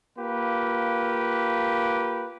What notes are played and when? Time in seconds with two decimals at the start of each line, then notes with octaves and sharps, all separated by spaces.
0.18 A#3 F4 G4 B4